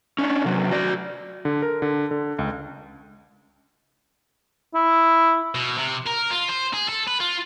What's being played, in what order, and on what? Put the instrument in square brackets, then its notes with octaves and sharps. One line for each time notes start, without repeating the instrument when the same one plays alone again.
[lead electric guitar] C#4 D4
C3 F#3
F#4 D5
[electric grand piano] D3
A#4
D3
D3
C#2
[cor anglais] E4
[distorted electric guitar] B2
C3
A#4
F4
C5
G#4
A4
B4
F4